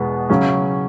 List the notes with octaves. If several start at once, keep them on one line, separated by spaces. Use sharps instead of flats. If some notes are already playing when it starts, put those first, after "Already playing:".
Already playing: E2 B2 G#3 B3
C#3 F#3 C#4